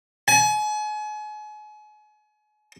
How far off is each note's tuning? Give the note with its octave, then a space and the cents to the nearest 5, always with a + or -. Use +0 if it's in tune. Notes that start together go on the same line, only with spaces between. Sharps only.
G#5 +35